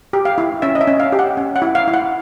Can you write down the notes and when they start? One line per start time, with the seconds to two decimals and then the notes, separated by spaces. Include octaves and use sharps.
0.13 G4
0.25 F5
0.38 E4
0.62 C#4 E5
0.75 D#5
0.81 E5
0.87 C#4
1.00 F5
1.12 G4
1.19 F#5
1.37 C#4
1.56 F#5
1.62 E4
1.75 F5
1.88 E4
1.94 F#5